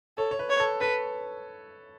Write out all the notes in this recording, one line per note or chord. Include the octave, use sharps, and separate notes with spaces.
A4 C#5
C#5
B4
C#5
A4
A4 B4